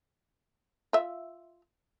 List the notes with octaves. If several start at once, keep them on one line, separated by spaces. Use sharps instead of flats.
F4 E5